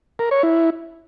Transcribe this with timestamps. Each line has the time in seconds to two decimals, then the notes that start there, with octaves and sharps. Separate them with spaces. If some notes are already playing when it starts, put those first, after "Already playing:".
0.19 A#4
0.31 C#5
0.43 E4